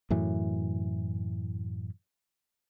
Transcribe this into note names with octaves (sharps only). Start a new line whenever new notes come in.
F#2 A2 E3